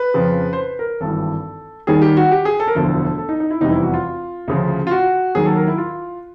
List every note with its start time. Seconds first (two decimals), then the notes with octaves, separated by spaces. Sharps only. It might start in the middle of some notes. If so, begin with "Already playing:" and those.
Already playing: B4
0.14 F2 C#3 F3
0.53 C5
0.57 B4
0.79 A#4
1.01 G#1 G2 E3 A4
1.87 D#2 D#3 G3 G#4
2.02 G4
2.17 F#4
2.32 G4
2.45 G#4
2.60 A4
2.68 A#4
2.75 E1 D2 D3 F3 A4
3.18 A4
3.29 D#4
3.40 D#4
3.51 E4
3.61 F1 E2 C3 E3 G3 D#4
3.72 E4
3.83 F#4
3.94 F4
4.48 D2 C#3 F3
4.87 F4
4.91 F#4
5.35 D#2 D#3 F#3 G#4
5.45 A4
5.57 A#4
5.68 E4
5.78 F4